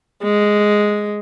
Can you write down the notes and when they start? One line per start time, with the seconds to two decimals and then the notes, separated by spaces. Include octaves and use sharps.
0.23 G#3